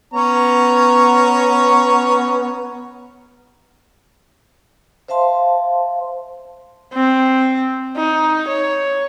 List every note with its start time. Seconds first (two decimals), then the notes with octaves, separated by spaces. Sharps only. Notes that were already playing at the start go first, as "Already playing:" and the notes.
0.14 B3 C#4 C#5 A#5
5.08 C5 E5 F5 A5 C6
6.94 C4
7.97 D#4
8.48 C#5